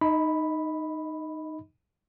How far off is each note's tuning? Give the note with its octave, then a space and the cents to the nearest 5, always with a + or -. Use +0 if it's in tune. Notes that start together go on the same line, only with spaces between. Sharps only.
D#4 -10 D#5 +25 B5 +0